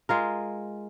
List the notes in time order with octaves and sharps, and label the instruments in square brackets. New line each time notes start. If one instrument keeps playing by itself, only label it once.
[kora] G#3 F4 A#4